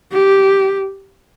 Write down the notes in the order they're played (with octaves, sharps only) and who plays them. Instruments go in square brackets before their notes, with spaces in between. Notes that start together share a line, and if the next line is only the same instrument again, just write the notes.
[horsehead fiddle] G4